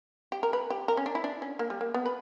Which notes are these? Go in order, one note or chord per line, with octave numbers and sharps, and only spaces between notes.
G4
A#4
B4
G4
A#4
C#4
D4
E4
D4
C#4
A#3
G3
A#3
B3
B4